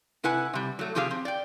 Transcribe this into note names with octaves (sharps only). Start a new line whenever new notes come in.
C3 E4 B4 F#5 G#5
C3 G3
F#3 A3
C3 F3 G4 G#4 C5 F5
C4
D5 G5